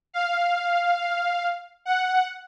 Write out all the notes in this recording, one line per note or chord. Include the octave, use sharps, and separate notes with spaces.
F5
F#5